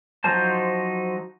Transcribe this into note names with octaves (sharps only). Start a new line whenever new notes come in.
F3 F#3 D#4 C5 A5